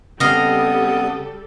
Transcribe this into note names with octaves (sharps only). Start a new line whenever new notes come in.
C#3 G3 B3 C4 A4 D#5 F5 D#6